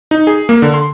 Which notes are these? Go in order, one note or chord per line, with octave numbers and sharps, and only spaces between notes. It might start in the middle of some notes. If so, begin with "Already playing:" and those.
D#4
G#4
A#3
D3
C6